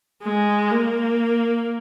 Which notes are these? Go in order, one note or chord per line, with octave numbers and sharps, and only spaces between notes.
G#3
A#3